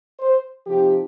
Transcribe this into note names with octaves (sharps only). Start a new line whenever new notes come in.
C5
C3 F3 C4 D#4 G4